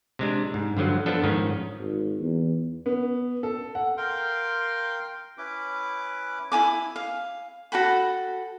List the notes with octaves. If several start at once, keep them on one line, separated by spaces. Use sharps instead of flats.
C3 G#3 D4
G#2
G2 D3 F3 F#3
F3 B3 D4 A4
G#2 D#3 F3 C#4
G#1
E2
B3
A4
F#5
A#4 F5 G5 C6
C#4 E4 B4 D6
E4 C#5 G#5 D6
F5
F#4 A4 G5 B5